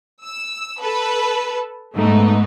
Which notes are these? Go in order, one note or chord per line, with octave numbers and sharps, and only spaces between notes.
E6
A4 B4
G#2 A3 B3 D#4